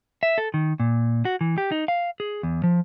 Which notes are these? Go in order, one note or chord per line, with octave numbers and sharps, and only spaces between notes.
E5
A4
D#3
A#2
F#4
E3
G4
D#4
F5
G#4
E2
F3